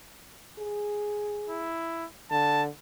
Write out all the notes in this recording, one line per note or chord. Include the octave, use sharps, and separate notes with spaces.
G#4
E4
D3 A5